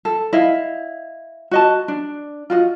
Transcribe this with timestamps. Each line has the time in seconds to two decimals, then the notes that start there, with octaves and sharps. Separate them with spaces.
0.05 A4
0.33 E4 D#5 F5
1.51 F#4 D#5 A5
1.88 D4
2.50 F4 F#4 D#5